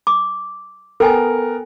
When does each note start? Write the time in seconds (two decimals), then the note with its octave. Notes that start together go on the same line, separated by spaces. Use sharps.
0.07 D6
1.00 B3 A4 A#4 G5 G#5